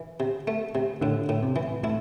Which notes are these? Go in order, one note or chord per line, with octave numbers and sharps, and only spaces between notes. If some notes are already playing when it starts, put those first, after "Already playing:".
Already playing: E3
C3
A3
C3
A2 D3
A2
C3
E3
A2 E4